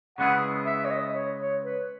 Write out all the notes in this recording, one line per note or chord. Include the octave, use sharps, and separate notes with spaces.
C#3 G#3 B3 E4 G#4 F#5
E5
C#5
D#5
C#5
C#5
B4